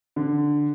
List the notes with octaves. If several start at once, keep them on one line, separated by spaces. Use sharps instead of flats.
D3